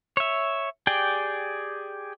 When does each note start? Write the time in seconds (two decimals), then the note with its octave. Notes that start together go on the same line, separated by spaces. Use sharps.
0.17 C#5 E5
0.87 G4 G#4 D5 G5